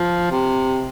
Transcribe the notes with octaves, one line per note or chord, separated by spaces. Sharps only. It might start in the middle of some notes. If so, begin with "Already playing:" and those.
Already playing: F3
C3